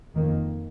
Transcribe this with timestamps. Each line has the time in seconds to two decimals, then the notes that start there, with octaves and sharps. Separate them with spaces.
0.15 F2 D#3 A#3